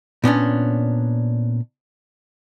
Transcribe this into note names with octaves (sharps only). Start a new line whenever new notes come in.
A#2 B3 C#4 D4